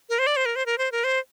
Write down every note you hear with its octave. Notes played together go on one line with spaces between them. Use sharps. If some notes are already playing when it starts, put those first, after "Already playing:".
A#4
C5
D5
C5
A#4
C5
A#4
C5
A#4
C5